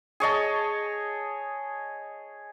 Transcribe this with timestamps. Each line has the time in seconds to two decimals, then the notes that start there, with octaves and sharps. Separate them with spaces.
0.20 G#4 C#5 D#5 A5